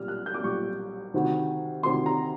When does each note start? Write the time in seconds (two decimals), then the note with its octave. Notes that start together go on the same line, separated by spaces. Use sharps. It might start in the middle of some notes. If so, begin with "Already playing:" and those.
Already playing: B1 A#2 G3 F6
0.08 F#6
0.26 G6
0.34 D6
0.43 B1 A#2 G3 C#6
1.14 D2 C3 D#3
1.83 D2 C3 D#3 C6
2.06 A#5